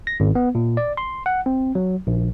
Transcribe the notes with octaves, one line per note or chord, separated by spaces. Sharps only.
A#6
G#1
B3
A#2
D5
C6
F#5
C4
F#3
A#1